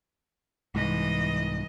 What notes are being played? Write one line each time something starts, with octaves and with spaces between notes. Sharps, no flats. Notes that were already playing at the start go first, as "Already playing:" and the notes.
C2 G#2 E3 D#5